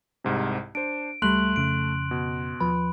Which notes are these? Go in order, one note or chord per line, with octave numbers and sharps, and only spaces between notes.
C2 G#2 C3
D4 C5 D7
C#2 G3 A3 B5 C6 F#6 F#7
F2 C#3 D7
B2
D#2 F3 B4 B5